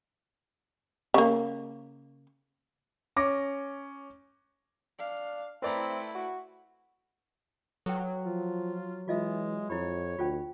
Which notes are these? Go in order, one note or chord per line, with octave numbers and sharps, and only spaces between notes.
C#3 A#3
C#4 D6 A#6
D4 F5
A3 C4 E4 B4 D5 A#5
F#4
F#3 A4 B4 G5
F3 F4
E3 G#3 F4 D#5 E5
F2 E4 C#5 B5
D2 F4 C5 G5